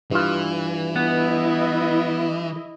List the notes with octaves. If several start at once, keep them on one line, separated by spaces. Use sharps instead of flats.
G2 E3 F4
B3 E4 D#5